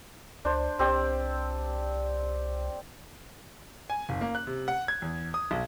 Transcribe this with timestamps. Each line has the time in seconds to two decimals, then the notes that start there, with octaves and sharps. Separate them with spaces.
0.45 C#2 D4 C5
0.79 C2 C4 G4 D5
3.90 G#5
4.09 F#1
4.21 A#3
4.35 F#6
4.47 C3
4.68 F#5
4.88 G#6
5.02 E2
5.34 D#6
5.51 B1